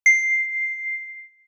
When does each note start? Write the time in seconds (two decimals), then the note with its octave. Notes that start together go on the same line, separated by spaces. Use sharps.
0.06 C7